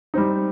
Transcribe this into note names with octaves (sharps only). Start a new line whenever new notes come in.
G3 C4 D#4